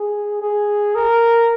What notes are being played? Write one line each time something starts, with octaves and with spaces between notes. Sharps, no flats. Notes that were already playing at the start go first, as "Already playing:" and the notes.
Already playing: G#4
G#4
A#4